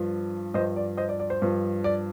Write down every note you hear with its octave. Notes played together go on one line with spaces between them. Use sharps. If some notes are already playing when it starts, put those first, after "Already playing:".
Already playing: G2 F3
G2 F3 C5 D#5
D5
C5 D#5
D5
D5
C5
G2 F3
D5